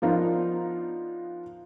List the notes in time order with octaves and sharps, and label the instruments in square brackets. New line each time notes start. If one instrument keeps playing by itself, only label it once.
[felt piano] F3 B3 D4 D#4 F4 A#4